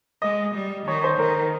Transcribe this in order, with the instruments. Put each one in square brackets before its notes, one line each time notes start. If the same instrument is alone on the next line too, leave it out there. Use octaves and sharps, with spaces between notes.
[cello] G#3 [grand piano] D#5
[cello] G3
[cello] D#3 [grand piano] C#5
[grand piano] C5
[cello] D#3 [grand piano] A#4